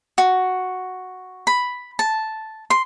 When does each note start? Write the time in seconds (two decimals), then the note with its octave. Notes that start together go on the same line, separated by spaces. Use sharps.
0.18 F#4
1.47 B5
1.99 A5
2.70 C6